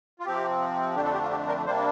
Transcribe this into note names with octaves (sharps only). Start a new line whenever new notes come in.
F4
C3 F3 C4 G4
F2 D3 A3 D4 G4
A4
G4
F4
G4
A#4
C3 G3 A#3 D4 C5